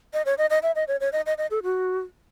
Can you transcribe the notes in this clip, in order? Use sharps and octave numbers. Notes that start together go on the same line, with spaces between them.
D#5
C#5
D#5
D#5
E5
D#5
C#5
C#5
D#5
D#5
D#5
A4
F#4